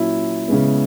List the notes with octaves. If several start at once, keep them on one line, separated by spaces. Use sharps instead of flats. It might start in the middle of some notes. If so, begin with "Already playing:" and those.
Already playing: A#2 F#3 C#4 E4
C#3 G#3 B3